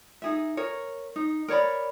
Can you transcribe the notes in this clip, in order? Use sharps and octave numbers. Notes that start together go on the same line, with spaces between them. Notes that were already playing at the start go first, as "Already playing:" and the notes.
D#4 G#4 E5
A#4 C#5
D#4
A#4 C#5 D5 B5